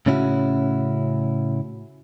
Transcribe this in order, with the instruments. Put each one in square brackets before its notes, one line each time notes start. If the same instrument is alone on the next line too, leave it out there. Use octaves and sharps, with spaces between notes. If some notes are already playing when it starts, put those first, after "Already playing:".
[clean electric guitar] A2 C#3 C#4 E4 F#4